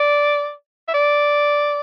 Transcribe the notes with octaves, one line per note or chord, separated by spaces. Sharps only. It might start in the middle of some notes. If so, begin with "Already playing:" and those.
Already playing: D5
E5
D5